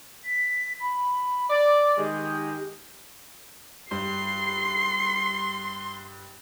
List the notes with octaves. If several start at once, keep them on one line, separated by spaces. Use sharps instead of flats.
B6
B5
D5 D6
D#3 G#3 G4
G2 C6 C7